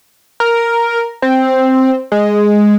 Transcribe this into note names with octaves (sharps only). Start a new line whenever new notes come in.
A#4
C4
G#3